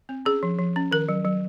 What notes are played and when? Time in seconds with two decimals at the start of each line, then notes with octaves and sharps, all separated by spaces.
0.09 C4
0.25 C#4 G#4
0.43 F3
0.59 F3
0.76 C#4
0.91 D#3 A#4
1.09 F#3
1.25 F#3